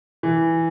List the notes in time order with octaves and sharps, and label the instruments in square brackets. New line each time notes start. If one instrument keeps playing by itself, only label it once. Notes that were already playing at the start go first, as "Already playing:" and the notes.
[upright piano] E3